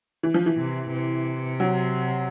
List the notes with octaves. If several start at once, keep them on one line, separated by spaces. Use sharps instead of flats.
E3
F3
E3
C3
C3
F#3